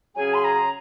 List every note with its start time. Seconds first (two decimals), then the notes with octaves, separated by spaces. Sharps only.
0.16 C#3 F#3 C#4 G#4 G#5
0.34 C6
0.44 A#5